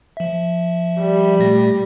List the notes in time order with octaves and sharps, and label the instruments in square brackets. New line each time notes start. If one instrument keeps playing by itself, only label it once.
[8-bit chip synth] F3 E5
[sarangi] G3
[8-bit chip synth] A#2 A3 A#6